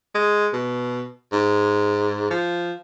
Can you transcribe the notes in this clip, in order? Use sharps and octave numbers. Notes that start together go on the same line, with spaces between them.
G#3
B2
G#2
F3